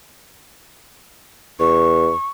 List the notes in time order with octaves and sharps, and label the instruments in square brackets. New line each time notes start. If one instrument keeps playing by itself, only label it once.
[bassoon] E2 [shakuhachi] C#6